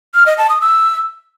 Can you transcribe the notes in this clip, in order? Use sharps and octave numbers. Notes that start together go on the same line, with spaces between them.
F6
D#5
A5
D#6
E6